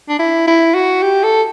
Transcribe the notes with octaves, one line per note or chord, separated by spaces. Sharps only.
D4
E4
E4
F#4
G4
A4